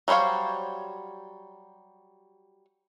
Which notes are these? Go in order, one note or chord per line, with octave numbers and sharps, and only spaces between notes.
F#3 G3 C5 C#5 F5